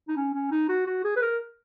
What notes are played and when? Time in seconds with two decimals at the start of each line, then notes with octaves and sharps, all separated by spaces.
0.08 D#4
0.16 C#4
0.34 C#4
0.51 D#4
0.69 F#4
0.87 F#4
1.04 G#4
1.16 B4
1.22 A#4